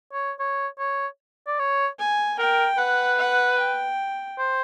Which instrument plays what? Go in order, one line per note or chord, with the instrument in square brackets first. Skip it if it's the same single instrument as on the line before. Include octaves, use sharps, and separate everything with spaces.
[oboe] C#5
C#5
C#5
D5
C#5
[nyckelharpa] G#5
[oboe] A#4 [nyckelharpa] G5
[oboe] B4 [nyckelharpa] F#5
[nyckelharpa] F#5
G5
[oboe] C5